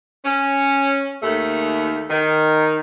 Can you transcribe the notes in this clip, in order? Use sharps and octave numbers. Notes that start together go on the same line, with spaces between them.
C#4
D#2 A3
D#3